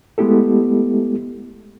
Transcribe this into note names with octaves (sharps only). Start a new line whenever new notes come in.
G#3 A3 B3 E4 G4 A4